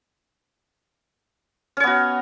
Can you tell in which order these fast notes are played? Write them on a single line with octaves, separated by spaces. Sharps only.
C#4 C#5 B3 F#4